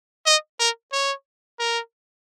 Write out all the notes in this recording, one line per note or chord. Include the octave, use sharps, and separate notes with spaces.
D#5
A#4
C#5
A#4